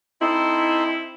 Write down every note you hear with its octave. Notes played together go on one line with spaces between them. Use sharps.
C4 D#4 E4 A4 C6